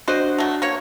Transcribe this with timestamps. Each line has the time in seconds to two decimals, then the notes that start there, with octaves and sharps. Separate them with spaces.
0.08 D4 F#4 C5 D#5
0.38 F#3 A3
0.62 A#3 C#5